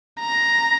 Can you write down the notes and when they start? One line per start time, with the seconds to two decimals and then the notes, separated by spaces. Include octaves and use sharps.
0.20 A#5